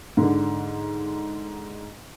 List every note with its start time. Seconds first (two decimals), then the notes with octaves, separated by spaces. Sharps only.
0.17 G#2 D3